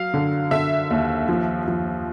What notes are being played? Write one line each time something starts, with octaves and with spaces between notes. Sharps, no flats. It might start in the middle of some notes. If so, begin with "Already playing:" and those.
Already playing: F#3 F5
D3
D3 E5
D#2
F3
F3